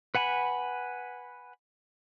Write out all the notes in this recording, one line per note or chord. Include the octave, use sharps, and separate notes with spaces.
B4 F#5 G#5 B5